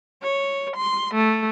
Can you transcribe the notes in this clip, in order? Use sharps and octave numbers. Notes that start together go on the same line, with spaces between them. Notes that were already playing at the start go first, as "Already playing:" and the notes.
C#5
C6
A3